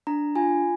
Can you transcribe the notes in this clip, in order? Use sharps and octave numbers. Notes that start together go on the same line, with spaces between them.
D4 A#5
F4 G#5